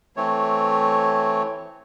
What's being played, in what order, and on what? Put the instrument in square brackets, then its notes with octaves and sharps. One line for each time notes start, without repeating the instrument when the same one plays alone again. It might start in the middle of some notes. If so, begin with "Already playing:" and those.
[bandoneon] E3 A3 C4 C#5